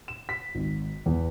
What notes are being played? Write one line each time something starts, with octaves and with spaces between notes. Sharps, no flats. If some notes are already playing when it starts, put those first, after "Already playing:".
E7
B6
G#1
E2